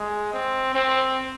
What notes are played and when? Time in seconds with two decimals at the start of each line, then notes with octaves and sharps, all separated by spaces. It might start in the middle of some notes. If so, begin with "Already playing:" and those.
Already playing: G#3
0.33 C4
0.75 C4